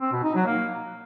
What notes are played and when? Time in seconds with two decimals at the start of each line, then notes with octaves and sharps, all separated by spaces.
0.01 C4
0.12 B2
0.24 D#4
0.35 F#3
0.46 A#3